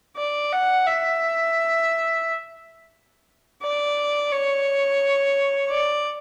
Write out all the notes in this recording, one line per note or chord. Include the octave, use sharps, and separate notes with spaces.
D5
F#5
E5
D5
C#5
D5